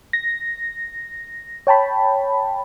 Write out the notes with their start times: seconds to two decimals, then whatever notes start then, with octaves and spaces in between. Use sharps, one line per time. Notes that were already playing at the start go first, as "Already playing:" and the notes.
0.13 A#6
1.67 C#5 G5 A5 B5